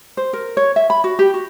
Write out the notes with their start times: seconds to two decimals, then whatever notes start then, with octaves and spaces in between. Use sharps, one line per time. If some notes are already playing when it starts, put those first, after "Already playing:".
0.17 C5
0.33 A#4
0.57 C#5
0.76 E5
0.90 B5
1.04 F#4
1.19 G4
1.34 F#4